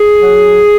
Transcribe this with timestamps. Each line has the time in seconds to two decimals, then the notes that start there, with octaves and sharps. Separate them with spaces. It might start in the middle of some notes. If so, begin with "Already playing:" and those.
Already playing: G#4
0.21 F#3